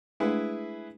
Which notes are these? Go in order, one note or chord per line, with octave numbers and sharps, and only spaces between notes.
G#3 A3 D4 E4 G#4 B4